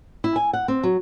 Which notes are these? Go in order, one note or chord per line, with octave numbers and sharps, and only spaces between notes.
E4
G#5
F#5
C4
F#3